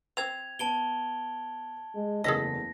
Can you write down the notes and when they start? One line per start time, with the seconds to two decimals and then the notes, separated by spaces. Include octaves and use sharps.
0.17 C4 G#6 F7
0.59 B3 A5 D7 G7
1.95 G#3
2.24 F#1 E2 A3 G#4 A4 D#5 A#6 B6